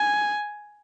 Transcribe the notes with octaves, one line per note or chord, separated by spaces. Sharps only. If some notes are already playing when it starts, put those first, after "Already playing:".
Already playing: G#5